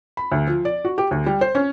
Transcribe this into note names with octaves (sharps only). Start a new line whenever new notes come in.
B5
D2
F3
D5
F#4
G4
D2
G3
C5
C#4